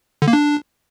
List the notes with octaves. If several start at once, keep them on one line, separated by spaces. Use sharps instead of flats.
D3
A#3
D4